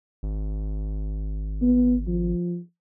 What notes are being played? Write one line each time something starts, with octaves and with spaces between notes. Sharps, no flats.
G#1
B3
F3